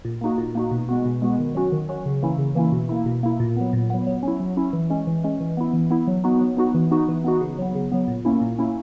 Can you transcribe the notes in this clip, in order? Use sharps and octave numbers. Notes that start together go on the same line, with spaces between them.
A#2
A#3 D#4 F#4
A#2
A#3 D#4 F#4
B2
G#3 B3 F#4
B2
G#3 B3 F#4
D#3
F#3 C#4 F#4
D#3
F#3 C#4 F#4
C#3
E3 A#3 C#4 E4
C#3
E3 A#3 C#4 E4
B2
A#3 E4
B2
A#3 E4
A#2
F#3 B3
A#2
F#3 B3
F#3
C#4 E4
F#3
C#4 E4
E3
G#3 C#4
E3
G#3 C#4
E3
B3 E4
E3
B3 E4
F#3
B3 D#4 F#4
F#3
B3 D#4 F#4
E3
B3 D#4 F#4
E3
B3 D#4 F#4
C#3
F#3 B3
C#3
F#3 B3
A#2
A#3 C#4 E4
A#2
A#3 C#4 E4